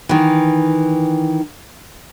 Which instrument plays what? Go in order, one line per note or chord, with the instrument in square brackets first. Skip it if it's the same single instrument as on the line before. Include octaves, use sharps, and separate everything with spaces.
[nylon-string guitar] D#3 E3